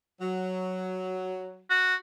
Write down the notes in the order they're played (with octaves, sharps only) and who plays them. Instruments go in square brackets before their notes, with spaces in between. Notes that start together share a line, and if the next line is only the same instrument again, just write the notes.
[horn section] F#3
[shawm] F#4